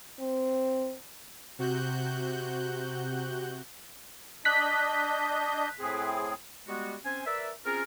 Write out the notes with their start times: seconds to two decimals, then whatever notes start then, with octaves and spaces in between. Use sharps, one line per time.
0.20 C4
1.58 C3 F#4 F#6 G6
4.45 D4 D#5 F#6 G6 B6
5.80 A2 C4 G#4
6.67 G3 G#3 B3 F#4
7.05 C4 C#4 C5 G#5
7.26 A#4 B4 D5 E5
7.66 C4 C#4 F4 G#4 A#4